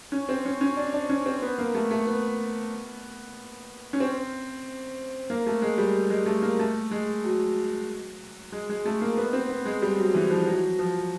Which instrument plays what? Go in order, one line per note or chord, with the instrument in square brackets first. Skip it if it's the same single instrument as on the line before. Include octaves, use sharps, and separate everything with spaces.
[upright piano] C#4
C4
C#4
C#4
D4
D4
C#4
C4
B3
A#3
A3
A3
B3
C#4
C4
A#3
A3
G#3
G3
G#3
A3
A#3
A3
G#3
F#3
G#3
G#3
A3
A#3
B3
C4
B3
G#3
G3
F#3
E3
F3
F#3
F3